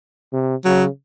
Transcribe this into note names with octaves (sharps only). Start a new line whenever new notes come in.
C3
C#3 F#3